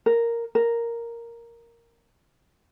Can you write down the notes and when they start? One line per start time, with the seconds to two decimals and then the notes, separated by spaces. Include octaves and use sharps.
0.06 A#4
0.55 A#4